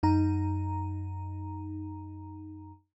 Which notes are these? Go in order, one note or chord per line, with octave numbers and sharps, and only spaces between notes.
F#2 D#4 A#5